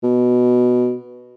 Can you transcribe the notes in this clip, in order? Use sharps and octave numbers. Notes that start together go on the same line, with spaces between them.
B2